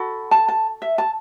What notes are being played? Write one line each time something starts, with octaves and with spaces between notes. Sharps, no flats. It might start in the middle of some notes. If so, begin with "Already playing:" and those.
Already playing: F#4 A4 B5
A5
A5
E5
A5